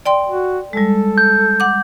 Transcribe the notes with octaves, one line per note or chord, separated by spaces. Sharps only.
D5 G5 C6
F#4
G3 G#3 A4
G6
F#5 D6